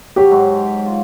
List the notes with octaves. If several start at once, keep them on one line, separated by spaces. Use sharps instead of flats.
F#3 G4
G#2 F#3 G#3
F4